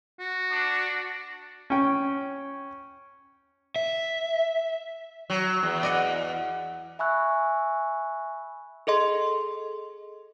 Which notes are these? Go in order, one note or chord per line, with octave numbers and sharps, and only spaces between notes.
F#4
D4
C#4 G5
E5
F#3
E2
D5 D#5 F#5
E5 G#5 B5 C#6 E6 F#6
G#4 A4 D#5 C6